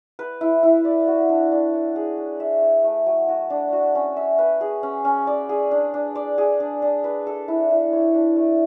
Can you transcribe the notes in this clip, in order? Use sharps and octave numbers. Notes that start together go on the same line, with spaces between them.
B4
E4
E4
D5
F#4
D4
D4
C#5
G#4
D4
E5
C#5
A3
F#3
F#4
D4
F#4
C#4
E5
B4
G#4
C#4
C#4
D5
G#4
D4
D4
D5
G#4
D4
D4
B4
A4
E4
E4
C#5
D4
A3